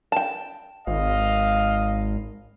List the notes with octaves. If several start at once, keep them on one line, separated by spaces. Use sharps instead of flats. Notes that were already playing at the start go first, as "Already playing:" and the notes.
G5 A5
G#1 D#5 F5